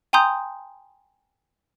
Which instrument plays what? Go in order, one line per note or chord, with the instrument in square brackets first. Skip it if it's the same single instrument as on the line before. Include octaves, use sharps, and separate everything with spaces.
[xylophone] G5 G#5 A#5 C6 D#6 G6